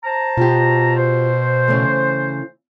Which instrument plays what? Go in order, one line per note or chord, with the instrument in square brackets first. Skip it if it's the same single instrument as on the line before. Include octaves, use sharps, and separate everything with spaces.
[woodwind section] C5 A5 A#5
[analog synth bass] B2 [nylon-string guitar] F4 G4
[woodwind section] C5
[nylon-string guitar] C#3 E3 A3